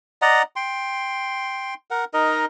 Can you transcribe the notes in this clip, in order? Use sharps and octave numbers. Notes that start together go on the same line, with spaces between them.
D5 D#5 F#5 A#5
G5 C6
A#4 F#5
D#4 A#4 D#5